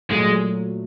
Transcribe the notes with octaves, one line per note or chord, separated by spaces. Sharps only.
A#2 F#3 G#3 A3